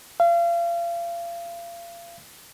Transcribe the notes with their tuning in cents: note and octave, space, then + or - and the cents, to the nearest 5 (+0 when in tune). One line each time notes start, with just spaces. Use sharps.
F5 -35